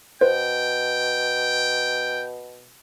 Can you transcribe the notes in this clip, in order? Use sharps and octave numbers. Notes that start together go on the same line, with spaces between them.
B2 B4 C5 G5